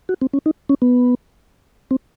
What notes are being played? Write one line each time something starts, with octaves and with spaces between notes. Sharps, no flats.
F#4
C4
C#4
D#4
C#4
B3
C4